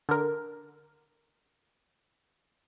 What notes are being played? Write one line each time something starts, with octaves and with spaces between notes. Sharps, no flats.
D3 A#4